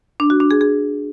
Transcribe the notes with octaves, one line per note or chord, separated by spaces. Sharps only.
D4
F#4
D4
G#4
G#4